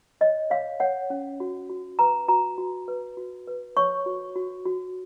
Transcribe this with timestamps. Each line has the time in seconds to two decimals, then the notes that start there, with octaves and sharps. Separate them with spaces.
0.21 C#5 D#5
0.50 C#5 F5
0.80 C#5 F#5
1.10 C#4
1.40 F#4
1.70 F#4
1.99 B4 A#5
2.28 F#4 A#5
2.58 F#4
2.88 B4
3.17 F#4
3.47 B4
3.77 C#5 C#6
4.06 F#4
4.36 F#4
4.65 F#4